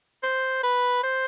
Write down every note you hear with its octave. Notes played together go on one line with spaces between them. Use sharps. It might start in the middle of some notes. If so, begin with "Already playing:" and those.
C5
B4
C5